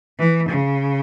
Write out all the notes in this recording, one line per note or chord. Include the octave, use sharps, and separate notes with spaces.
E3
C#3